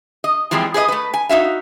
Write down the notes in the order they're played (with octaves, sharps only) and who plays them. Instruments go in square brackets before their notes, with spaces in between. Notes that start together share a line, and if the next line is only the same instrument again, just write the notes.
[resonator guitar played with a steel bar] D#5
E3 F3 G3 G#3 C4
G#4 B4 D5 D#5
A3 B4
G#5
D#4 F#4 E5 F5